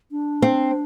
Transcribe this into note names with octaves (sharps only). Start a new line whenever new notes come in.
D4
C4